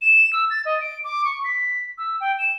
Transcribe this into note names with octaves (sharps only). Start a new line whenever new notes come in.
E7
E6
A6
D#5
D7
D6
C#6
B6
E6
G5
E7